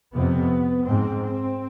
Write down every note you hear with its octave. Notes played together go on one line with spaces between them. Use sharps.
F2 C3 B3
G#2 C4
C4